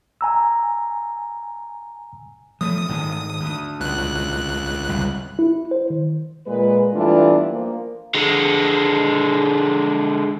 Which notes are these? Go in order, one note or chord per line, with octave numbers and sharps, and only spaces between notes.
G#5 A#5 E6
F3 A3 D#6
G#1 A2 D#3
D2
C#2 F#6
G1 C2
E4
C5
D#3
A#2 G#3 B4
G2 E3 A3 B3 D4 F4
F3 A#3
D3 G#3